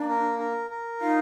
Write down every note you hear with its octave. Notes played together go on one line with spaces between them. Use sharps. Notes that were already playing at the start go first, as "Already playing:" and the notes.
Already playing: A#3 D4
A#4
A#4
A#4
D#4 F4